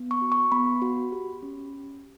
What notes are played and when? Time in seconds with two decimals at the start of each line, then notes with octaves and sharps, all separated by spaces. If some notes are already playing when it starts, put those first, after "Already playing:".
Already playing: B3
0.11 C#6
0.22 F#4
0.32 C#6
0.52 B3 B5
0.82 F#4
1.12 G4
1.43 C#4